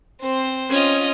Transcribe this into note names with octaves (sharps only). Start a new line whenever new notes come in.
C4 C5
C#4 F4 D#5